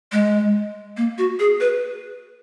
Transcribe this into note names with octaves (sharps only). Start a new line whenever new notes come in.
G#3
A#3
F#4
G#4
B4